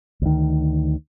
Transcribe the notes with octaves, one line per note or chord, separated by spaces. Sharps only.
D2 D#3